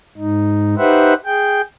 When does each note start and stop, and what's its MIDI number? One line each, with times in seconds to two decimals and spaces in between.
0.17 0.75 44
0.17 0.75 63
0.78 1.14 63
0.78 1.14 67
0.78 1.14 71
0.78 1.14 72
0.78 1.14 76
0.78 1.14 78
1.26 1.61 68
1.26 1.61 79